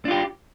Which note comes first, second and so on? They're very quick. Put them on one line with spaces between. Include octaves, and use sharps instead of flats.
D4 F4 G4